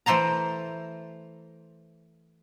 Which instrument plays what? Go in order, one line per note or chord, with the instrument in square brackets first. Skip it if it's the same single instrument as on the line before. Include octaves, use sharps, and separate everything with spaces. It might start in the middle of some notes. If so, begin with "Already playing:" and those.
[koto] E3 A3 C5 A5 A#5